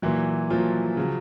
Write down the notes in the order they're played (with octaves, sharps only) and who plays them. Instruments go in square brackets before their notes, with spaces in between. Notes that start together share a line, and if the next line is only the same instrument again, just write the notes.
[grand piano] A#2 E3 F#3 E4
A#2 F3 F#3 F4
C#3 F#3